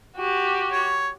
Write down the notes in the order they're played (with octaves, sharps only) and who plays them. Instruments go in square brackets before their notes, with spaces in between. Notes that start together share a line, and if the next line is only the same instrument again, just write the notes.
[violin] F#4 G4
[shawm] C#5